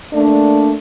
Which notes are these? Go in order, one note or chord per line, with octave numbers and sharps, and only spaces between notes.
A3 A#3 D4